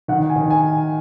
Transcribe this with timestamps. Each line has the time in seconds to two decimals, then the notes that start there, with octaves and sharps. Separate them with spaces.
0.08 D#3 F#5
0.30 G#5
0.36 D#3
0.51 G#5